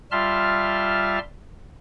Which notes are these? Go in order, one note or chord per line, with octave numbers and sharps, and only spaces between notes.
G3 F4 E5 A5 C6 F6